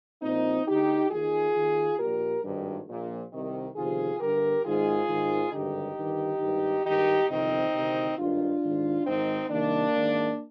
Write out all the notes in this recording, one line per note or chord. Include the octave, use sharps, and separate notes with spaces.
A#1 A#2 C4 D#4
D2 D3 D#4 G4
D#2 D#3 F4 G#4
D#2 D#3
A#1 A#2 G4 A#4
G#1 G2 D#3
A#1 A#2
C2 C3 D#3
G1 F2 C3 D#3 F4 G#4
G1 G2 D3 G4 A#4
G#1 G#2 D#3 F4 G#4
G#1 G#2 D#3
G#1 G2 D3 D#4 G4
G1 G2 D#3
G#1 G2 D#3
G#1 G2 D#3 D#4 G4
G1 F2 C3 D#3 C4 D#4
D2 C3 D#3
G#1 G2 D#3 D4 F4
G#1 G#2 D#3
G#1 G#2 D#3 C4 D#4
C2 C3 D#3 A#3 D4
G#1 G#2 D#3